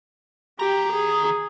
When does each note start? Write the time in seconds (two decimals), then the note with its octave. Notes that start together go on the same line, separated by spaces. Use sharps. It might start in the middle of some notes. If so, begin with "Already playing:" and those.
0.59 D#3 G4 A#5
0.92 G#4